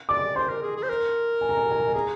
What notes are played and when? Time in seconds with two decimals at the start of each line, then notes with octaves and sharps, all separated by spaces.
0.09 D5 D6
0.36 C5 C6
0.49 A#4
0.62 G#4
0.76 G#4
0.83 C5
0.89 A#4
1.41 G#5
1.49 A#5
1.57 G#5
1.64 A#5
1.72 G#5
1.80 A#5
1.87 G#5
1.94 G#4 A#5